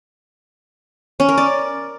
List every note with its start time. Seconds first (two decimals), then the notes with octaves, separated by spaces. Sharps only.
1.20 C#4
1.29 A#4
1.38 D5